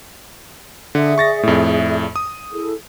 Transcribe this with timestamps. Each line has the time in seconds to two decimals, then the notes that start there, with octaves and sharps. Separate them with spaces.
0.95 D3 G#4 D5 E5
1.18 C#6 A6 A#6
1.43 F2 A2
2.16 D#6
2.52 E4 G#4 A4